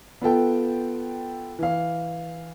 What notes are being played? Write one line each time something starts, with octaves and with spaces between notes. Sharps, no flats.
B3 F4 A4 G5
E3 F5